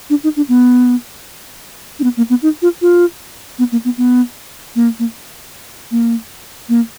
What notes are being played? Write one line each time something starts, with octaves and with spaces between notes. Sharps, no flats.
D4
D#4
D4
B3
D4
B3
A#3
B3
D#4
F4
F4
B3
A#3
B3
B3
A#3
A#3
A#3
A#3